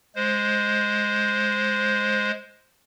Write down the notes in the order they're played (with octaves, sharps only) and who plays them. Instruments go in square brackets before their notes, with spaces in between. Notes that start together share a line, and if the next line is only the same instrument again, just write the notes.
[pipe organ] G#3 C5